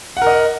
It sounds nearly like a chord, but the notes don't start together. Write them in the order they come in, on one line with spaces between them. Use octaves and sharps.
F#5 A#4 D#5